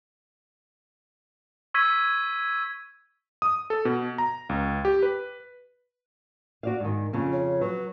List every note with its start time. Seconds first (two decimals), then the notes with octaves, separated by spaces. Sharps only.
1.74 C#6 E6 G#6 B6 D#7
3.42 D#6
3.70 A4
3.85 B2
4.18 A#5
4.49 C#2
4.85 G4
5.03 B4
6.63 F#4 D5 F5
6.80 G#2 D#3
7.13 F2 C#3
7.32 C#5
7.61 F#3 B4